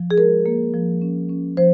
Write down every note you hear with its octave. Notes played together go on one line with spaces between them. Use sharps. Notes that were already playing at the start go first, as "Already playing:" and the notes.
Already playing: F3
G#4
G#3 A#4
A#3
F3
C#4
C#4
F3 C5